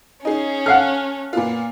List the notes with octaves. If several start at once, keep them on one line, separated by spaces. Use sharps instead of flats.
C#4 D#4 G#4
A4 F5 F#5 F6
A#2 B3 F4